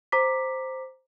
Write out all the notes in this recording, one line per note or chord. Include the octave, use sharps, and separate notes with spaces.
C5 A#5 D6 B6